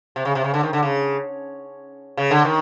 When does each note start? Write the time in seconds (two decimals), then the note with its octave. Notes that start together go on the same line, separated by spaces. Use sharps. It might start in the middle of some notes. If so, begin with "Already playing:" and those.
0.16 C3
0.25 C#3
0.35 C3
0.44 C#3
0.54 D3
0.63 D#3
0.73 D3
0.83 C#3
2.17 C#3
2.31 D3
2.45 D#3